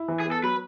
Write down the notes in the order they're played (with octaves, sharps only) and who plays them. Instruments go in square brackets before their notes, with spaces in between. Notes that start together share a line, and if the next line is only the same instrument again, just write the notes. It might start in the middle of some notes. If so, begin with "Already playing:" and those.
Already playing: [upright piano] E4
E3
[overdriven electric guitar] G#4
[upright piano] B3
[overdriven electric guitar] A4
[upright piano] F#3 [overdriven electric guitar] B4